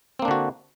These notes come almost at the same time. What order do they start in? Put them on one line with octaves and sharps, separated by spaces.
C4 A#3 D4 D3 F#4